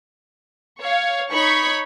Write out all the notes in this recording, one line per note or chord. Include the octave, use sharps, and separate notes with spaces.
C#5 F5
D#4 C#5 B5 C#6